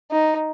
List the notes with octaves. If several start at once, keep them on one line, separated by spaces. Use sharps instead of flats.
D#4